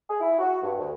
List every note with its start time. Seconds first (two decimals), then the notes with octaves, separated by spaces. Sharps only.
0.09 G#4
0.20 E4
0.39 F#4
0.63 G2
0.78 D2